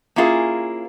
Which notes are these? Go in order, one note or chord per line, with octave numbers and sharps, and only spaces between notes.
A#3 C#4 E4 F4 G#4 A#4